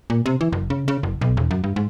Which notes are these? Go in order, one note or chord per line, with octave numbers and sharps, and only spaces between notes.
A#2
C3
E3
F#1
C#3
C#3
F#1
B1
E1
F#2
G2
G#2